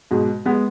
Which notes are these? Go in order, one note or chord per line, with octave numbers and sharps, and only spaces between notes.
G#2 B2
G#3 B3